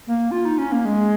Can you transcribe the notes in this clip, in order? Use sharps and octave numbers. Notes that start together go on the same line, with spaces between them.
A#3
F4
D#4
C#4
A#3
G#3